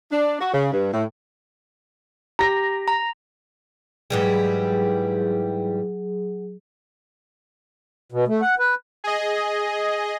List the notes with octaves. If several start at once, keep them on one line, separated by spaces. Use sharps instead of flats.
D4
F#4
C#3
G2
A2
G4 A#5 A#6
A#5
G#2 E3 F#3 G3 G#4
B2
A3
F#5
B4
G#4 D#5